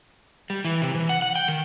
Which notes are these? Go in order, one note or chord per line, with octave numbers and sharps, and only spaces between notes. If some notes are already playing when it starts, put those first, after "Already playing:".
G3
E3
C3
E3
F#5
F#5
G5
D#3